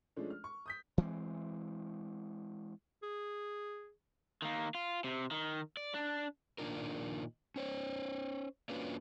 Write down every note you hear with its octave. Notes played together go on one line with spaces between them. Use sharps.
F3 G#3 A3 C#4 D4
F6
C#6
D#6 G6 B6
E3 G#3 B3 C4
G#4
D#3 A#3
F4
C3
D#3
D5
D4
A#2 D#3 E3 D4 F4 A#4
C#4 C5 C#5
A#3 C#4 D4 F4 F#4 B4